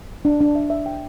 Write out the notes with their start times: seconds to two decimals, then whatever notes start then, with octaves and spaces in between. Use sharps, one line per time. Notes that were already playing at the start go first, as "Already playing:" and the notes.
0.25 D4
0.40 D4
0.55 E5
0.70 E5
0.86 G5